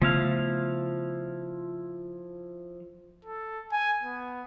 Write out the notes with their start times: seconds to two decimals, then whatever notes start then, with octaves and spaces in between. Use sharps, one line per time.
0.02 C#3 F3 A3 B3 E4 F5
3.25 A4
3.72 G#5
4.03 B3